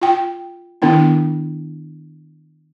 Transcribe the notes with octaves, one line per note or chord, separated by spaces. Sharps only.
F4 G5
D#3 B3 D4 E4